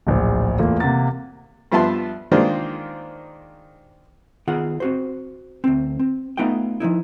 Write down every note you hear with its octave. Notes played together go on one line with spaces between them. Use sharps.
D1 A#1 C5
E2 A3 A#3 F4
C3 A#3 F#5 A#5 A6
G2 F3 B3 E5 A5 C6
D#3 G#3 A#3 D4 F4 C5
D#3 B3 F4 G#4 F#5
C4 F#4 C5
D2 C4
C4
A3 B3 D#4 F4 F#5 G5
F3 A3 D#4 E4